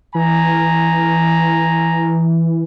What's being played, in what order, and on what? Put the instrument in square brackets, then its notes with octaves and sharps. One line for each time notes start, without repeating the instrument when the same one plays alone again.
[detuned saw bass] E3 [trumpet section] G#5 A#5